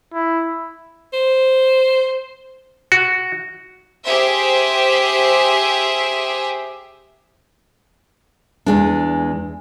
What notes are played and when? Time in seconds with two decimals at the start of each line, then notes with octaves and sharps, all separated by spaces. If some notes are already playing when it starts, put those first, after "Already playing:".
0.14 E4
1.13 C5
2.92 F#4
4.04 G4 G#4 C5 E5
8.66 E2 G#3 D4